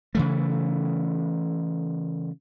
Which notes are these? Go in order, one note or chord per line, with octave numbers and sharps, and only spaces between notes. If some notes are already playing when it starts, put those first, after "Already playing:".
C#3 E3 A3